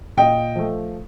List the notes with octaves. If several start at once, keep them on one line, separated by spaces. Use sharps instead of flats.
A#2 D#5 G5
F3 A3